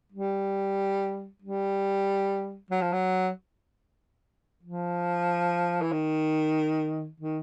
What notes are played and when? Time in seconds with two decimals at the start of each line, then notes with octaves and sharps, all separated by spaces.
0.12 G3
1.42 G3
2.70 F#3
2.81 F3
2.92 F#3
4.63 F3
5.81 E3
5.92 D#3
7.20 D#3